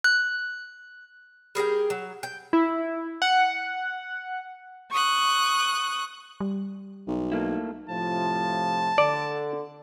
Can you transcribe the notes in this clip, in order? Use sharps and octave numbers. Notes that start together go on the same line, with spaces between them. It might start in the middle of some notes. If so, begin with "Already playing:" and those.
F#6
G3 G#4 A#4 G5
F#3
G5
E4
F#5
C#6 D#6 F#6
G3
B1
A3 A#3 E4
A2 C3 F3 A5
D3 D5